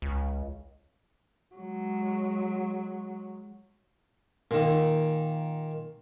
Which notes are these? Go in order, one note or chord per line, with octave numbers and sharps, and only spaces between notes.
C#2
F#3 G#3
A#2 D#3